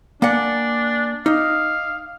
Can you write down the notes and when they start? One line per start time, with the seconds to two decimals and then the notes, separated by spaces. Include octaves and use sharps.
0.22 A#3 D4 D5 F#5 G#5 D6
1.26 D#4 F5 D6 D#6